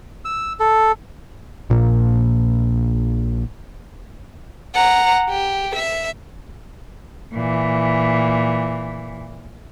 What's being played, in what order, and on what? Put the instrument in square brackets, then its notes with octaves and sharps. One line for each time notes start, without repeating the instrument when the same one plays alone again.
[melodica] E6
A4
[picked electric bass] A#1 A#2 A#3
[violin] F#5 A#5
G4
E5
[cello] A#2 E3